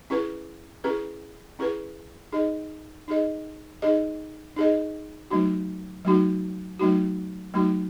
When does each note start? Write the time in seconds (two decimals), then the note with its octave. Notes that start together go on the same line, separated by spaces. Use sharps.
0.10 C#4 E4 G#4 B4
0.84 C#4 E4 G#4 B4
1.59 C#4 E4 G#4 B4
2.32 D#4 G#4 D#5
3.08 D#4 G#4 D#5
3.82 D#4 G#4 D#5
4.56 D#4 G#4 D#5
5.31 F#3 A3 D#4 F#4
6.05 F#3 A3 D#4 F#4
6.79 F#3 A3 D#4 F#4
7.54 F#3 A3 D#4 F#4